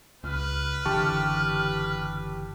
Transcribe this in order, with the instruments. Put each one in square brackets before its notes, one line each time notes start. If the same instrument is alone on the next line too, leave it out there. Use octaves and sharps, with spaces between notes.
[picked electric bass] C#2 [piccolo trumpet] B4 [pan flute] F6
[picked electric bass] F#1 D3 E3 [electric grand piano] G4 A5 C#6